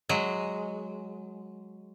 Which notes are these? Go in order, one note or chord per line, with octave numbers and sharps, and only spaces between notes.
F#3 G#3